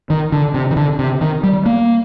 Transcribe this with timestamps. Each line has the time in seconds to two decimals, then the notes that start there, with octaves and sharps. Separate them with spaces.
0.10 D#3
0.32 D3
0.54 C3
0.71 D#3
0.76 D3
0.99 C3
1.21 D#3
1.44 G3
1.66 A#3